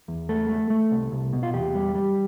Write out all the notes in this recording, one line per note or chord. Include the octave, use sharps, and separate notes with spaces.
E2
A3 A4
A3
A3
C2
C2
B2
F4
E2 G4
G3
G3